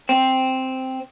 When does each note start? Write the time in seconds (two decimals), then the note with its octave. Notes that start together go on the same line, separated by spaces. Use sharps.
0.09 C4